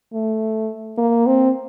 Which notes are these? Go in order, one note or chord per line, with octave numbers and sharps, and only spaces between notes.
A3
A#3
C4